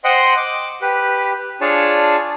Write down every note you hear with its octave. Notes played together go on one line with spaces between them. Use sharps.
C5 D#5 F#5 G5 C6
D6
G4 B4
D4 F4 G#4 C#5 A5